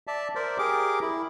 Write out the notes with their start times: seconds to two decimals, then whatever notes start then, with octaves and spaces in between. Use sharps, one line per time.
0.07 D5 E5 A5
0.35 A#4 C5 D5 E5
0.58 G4 G#4 A#4 D6
1.01 E4